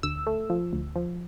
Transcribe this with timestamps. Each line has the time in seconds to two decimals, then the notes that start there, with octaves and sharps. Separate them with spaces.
0.03 D2 E6
0.27 A3
0.50 F3
0.73 D2
0.96 F3